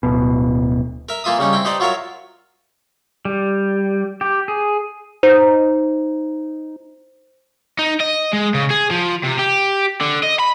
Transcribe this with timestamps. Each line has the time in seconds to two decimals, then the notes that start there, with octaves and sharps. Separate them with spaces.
0.03 D1 B2
1.09 A#4 E5
1.24 E3 A#3 F4 E5 D#6
1.39 C#3 G3 C#4 D#4
1.53 C4 E4 G5
1.65 D#4 G4 B4 C5 D5 D#5
1.80 F#3 F4 A#4 C#5 E5
3.25 G3
4.21 G4
4.48 G#4
5.23 D#4 C5
7.79 D#4
8.00 D#5
8.33 G#3
8.54 C#3
8.70 G#4
8.91 F3
9.24 C3
9.39 G4
10.01 D3
10.23 D#5
10.39 B5